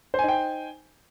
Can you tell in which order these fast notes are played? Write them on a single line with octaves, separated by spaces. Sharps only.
C5 G#5 D#4 G5